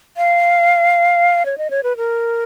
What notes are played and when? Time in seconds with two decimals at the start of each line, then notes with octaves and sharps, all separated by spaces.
0.17 F5
1.45 C#5
1.58 D#5
1.70 C#5
1.83 B4
1.97 A#4